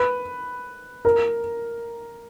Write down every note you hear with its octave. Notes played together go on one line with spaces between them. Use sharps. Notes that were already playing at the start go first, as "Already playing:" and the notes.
Already playing: B4
A#4